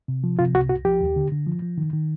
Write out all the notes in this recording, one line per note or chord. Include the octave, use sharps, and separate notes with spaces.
C3
F3
C3 F4
C2 F#4
C2 F#4
F3 G4
D#2
D3
D3
F3
F3
D#3
D#3